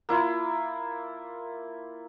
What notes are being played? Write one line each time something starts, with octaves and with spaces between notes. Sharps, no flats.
A#3 E4 F4